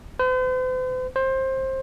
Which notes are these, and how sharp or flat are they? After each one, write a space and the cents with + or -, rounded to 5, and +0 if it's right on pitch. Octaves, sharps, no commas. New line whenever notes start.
C5 -45
C5 +20